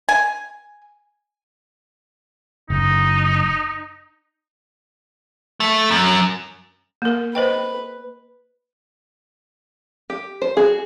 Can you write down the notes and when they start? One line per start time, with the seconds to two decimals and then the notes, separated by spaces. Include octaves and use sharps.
0.09 G#5
2.70 F#1 D#4
5.60 A3
5.91 F#2
7.02 A#3 A#4
7.35 B4 C5 D#5 G5
10.10 G4
10.42 C5
10.57 F#4 G#4